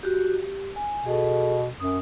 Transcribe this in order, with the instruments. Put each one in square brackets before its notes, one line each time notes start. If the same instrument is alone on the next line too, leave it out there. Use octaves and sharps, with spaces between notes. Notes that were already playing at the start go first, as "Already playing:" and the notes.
[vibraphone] F#4 G4
G4
G#5
[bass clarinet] B2 [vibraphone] G#4 A4
[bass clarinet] F#2 [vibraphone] D#6